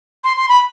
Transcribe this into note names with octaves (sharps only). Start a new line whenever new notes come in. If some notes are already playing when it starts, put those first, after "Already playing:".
C6
C6
B5